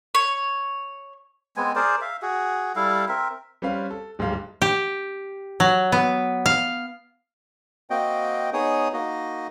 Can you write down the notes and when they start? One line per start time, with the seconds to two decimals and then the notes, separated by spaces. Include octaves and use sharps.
0.15 C#5
1.57 G#3 B3 C4 G#5
1.76 G#4 A#4 C5 D5
2.01 E5 F5
2.22 F#4 G#4
2.76 G3 E4 A4 F5
3.08 C4 A#4 E5
3.62 G3 C4 C#4 B4 F5
3.91 A4
4.19 D1 G#2 G3 A4 F5
4.62 G4
5.60 F#3
5.92 B3
6.46 F5
7.90 A#3 C4 F#4 D#5 G5
8.53 B3 D#4 G#4 C#5 D#6
8.93 A#3 D#4 F#4 D#5